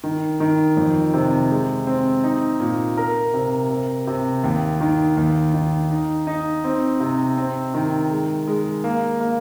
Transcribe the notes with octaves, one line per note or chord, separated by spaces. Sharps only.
D#3
D#3
F2
C3
G#3
C4
D#4
A#2
A#4
C3
C3
C3
D#2
D#3
D#2
D#3
D#4
D#4
C4
C3
C4
D#3
G#3
G#3
A#3
A#3